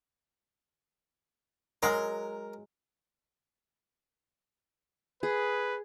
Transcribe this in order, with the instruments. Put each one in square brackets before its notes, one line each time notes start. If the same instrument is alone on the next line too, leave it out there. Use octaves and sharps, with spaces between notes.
[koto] F#3 G#3 [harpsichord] A#4
[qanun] G#4 [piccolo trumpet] B4